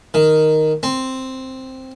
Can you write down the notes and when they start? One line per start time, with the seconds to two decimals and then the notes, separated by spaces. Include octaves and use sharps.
0.14 D#3
0.83 C4